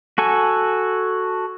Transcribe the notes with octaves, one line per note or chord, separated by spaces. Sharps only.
F#4 A4 G#5